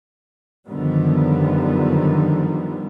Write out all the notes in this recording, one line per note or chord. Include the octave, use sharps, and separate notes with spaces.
F#2 D3 D#3 F3 G3 B3